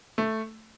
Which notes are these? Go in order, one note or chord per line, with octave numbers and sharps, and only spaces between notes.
A3